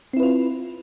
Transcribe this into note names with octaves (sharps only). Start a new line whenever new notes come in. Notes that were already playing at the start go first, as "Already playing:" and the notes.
C4 E4 F4 B4